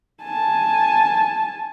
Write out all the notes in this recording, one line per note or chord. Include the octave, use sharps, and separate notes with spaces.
G#5 A5